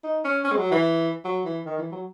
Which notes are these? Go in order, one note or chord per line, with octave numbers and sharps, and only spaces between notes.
D#4
C#4
C#4
G#3
F#3
E3
F#3
E3
D#3
E3
F#3